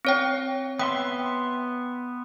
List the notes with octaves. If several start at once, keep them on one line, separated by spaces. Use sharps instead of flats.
C4 C#5 G5
B3 E5 G5 C6